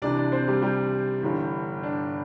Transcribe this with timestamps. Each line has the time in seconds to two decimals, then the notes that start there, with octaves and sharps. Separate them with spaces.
0.02 C2 C3 E3 D4 D5
0.17 D4 D5
0.32 C4 C5
0.48 G3 G4
0.62 G3 G4
1.23 G1 G2 E3
1.83 D4